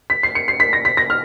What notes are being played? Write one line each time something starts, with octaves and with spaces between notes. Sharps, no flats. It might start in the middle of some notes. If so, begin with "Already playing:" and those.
B6
C7
C#7
C7
B6
A#6
B6
A#6
F6